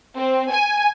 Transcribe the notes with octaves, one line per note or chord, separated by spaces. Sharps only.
C4
G#5